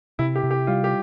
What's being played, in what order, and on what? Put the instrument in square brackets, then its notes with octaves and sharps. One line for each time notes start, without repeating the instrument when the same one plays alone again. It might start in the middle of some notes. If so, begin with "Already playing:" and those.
[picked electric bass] C3 [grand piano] E4
[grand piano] G4
[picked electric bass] C3
[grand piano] G4
[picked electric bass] G3 [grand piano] F4
[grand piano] G4